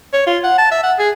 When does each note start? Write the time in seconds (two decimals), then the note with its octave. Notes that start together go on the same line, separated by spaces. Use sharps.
0.13 C#5
0.27 F4
0.43 F#5
0.58 A5
0.71 E5
0.83 F#5
0.99 G#4